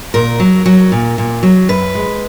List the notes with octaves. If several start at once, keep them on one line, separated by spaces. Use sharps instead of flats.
A#2 A#4
F#3
F#3
A#2
A#2
F#3
F#2 B4
G#3